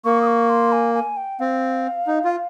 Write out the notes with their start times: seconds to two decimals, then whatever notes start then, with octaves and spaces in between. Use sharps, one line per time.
0.04 A#3 C#6
0.21 D#6
0.27 C#6
0.50 C6
0.72 G#5
0.94 G#5
1.17 G5
1.40 C4 F5
2.07 D#4
2.24 F4